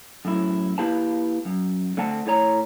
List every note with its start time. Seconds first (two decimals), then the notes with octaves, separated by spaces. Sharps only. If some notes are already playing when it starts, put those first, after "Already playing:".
0.25 F#2 A2 E4
0.78 A#3 E4 G4 B4 F5 A5
1.45 F#2
1.97 D3 A3 C4 F#5 A5
2.26 A2 A3 C#5 A#5